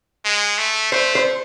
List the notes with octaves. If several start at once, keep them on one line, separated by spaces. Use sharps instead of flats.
G#3
A3
A3 C5
C5